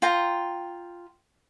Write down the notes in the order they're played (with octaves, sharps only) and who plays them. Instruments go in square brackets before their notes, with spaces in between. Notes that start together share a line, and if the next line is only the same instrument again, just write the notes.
[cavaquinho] F4 G5 A#5